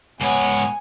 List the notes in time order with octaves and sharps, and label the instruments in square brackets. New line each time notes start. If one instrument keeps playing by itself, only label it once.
[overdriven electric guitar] G#2 C#5 [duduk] B3 [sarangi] G#5